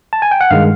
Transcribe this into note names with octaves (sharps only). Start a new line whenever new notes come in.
A5
G#5
G5
F#5
G2 D#3 G#3 F5